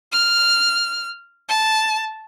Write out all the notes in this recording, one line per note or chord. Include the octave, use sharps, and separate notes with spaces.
F6
A5